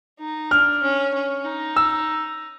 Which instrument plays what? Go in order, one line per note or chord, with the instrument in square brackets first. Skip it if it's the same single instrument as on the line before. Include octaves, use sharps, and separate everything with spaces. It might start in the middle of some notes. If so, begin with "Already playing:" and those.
[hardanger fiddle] D#4
[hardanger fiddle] D4 [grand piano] F6
[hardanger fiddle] C#4
C#4
D#4
[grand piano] E6